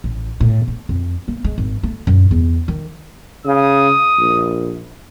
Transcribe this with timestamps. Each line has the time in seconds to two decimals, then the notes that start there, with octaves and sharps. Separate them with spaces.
0.04 A1
0.40 A2
0.68 A3
0.89 F2
1.28 A#3
1.44 G#3
1.58 G#1
1.83 A3
2.07 F#2
2.31 E2
2.68 D#3
3.46 C#3 D#6
4.18 A#1